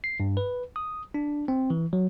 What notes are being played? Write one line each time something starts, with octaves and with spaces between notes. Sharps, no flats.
C7
G2
B4
D#6
D4
C4
E3
F#3